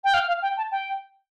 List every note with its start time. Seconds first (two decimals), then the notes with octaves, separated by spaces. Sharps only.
0.04 G5
0.14 F5
0.28 F5
0.42 G5
0.57 A5
0.72 G5